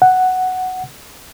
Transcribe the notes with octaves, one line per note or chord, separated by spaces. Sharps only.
F#5